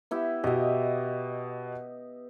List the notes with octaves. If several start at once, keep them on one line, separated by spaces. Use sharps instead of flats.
B3 E4 G4
B2 G4 D#5 E5